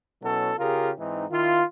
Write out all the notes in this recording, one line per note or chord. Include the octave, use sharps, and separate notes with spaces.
B2 F#3 C#4 E4 A4
C#3 F4 G4 G#4 A#4
G#2 E3 C4 D#4
D#3 E4 F4